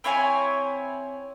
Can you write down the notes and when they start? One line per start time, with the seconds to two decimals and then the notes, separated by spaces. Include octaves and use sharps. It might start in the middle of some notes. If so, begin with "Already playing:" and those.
0.04 C4 E4 C#5 G#5